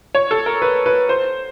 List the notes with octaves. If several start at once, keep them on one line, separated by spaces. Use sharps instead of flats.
C#5
A4
A#4
B4
B4
C5